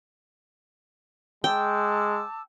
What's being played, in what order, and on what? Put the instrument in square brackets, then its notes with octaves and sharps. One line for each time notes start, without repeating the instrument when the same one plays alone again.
[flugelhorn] G#3 [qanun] G5 [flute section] A5 D6 E6